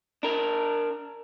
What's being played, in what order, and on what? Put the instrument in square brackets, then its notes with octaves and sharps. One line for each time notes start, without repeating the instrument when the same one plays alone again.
[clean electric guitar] D4 A#4